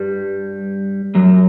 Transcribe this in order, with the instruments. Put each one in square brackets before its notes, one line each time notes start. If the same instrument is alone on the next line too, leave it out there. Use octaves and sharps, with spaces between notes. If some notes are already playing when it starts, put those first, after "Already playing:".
Already playing: [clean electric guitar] G2 G3
F#2 F#3